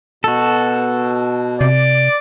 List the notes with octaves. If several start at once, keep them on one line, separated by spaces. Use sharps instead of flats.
B2 F#4 A4
C3 D5